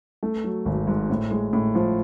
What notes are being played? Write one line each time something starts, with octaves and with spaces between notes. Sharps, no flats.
A3
F#3
G#1
G#2
A2
G#3
A2
F3